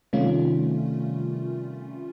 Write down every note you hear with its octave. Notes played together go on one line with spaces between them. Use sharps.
C3 D#3 G3 A3 C#4 F4